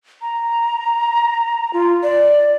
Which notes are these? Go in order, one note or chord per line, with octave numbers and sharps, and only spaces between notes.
A#5
F4
D5